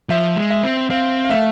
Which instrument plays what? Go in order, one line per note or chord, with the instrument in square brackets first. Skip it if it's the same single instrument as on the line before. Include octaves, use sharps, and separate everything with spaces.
[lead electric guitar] F3 [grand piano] E5
[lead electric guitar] G#3
[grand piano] E5
[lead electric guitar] C4
[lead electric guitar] C4 [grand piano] F5
[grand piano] F5
[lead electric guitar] A3 [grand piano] E5